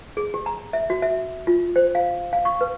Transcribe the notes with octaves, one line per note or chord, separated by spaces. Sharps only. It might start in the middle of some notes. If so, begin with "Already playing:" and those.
G#4
G4
A#5
E5
F#4
E5
F4
C5
F5
F5
C#6
B4